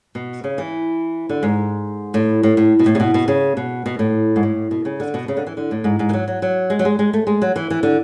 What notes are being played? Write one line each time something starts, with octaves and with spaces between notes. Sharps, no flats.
B2
C#3
E3
D3
G#2
A2
A2
A2
B2
A2
C#3
B2
B2
C#3
B2
B2
A2
G#2
A2
B2
C#3
D3
B2
C#3
D3
E3
D3
A2
G#2
G#2
E3
F#3
F#3
F#3
G#3
F#3
G#3
G#3
A3
G#3
F#3
E3
E3
D3